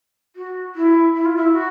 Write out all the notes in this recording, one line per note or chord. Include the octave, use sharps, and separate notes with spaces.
F#4
E4
E4
F4
E4
F#4